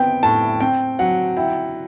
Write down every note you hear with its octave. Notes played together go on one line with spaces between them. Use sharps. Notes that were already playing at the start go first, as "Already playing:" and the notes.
Already playing: B3 C4 G5
A2 A5
C4 G5
F#3 F#5
E4 G5